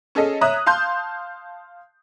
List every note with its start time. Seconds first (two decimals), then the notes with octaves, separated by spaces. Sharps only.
0.15 C#4 G#4 A4 D#5
0.41 C#5 E5 A#5 D#6 F#6
0.66 F5 A5 C6 G6